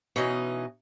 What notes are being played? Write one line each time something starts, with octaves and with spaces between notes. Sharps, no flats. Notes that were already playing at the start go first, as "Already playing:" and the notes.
B2 E3 C#4 D#4 D#5